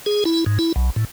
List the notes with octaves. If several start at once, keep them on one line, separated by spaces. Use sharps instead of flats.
G#4
E4
G#2
E4
B1
A2